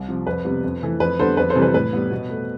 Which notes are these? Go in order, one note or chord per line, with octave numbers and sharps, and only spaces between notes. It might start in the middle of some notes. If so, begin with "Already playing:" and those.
Already playing: C2
C3 F3
F2 B4
C3 G3 B3
F2
E3 A3
F2 B4
D3 G3 B3 A4 C5
F2 B4
A4 C5
C3 E3 G3
B4
A2 B4
G3 B3
B2
A3